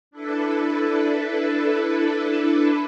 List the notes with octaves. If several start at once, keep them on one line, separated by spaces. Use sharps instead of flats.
D4 E4 A4 B4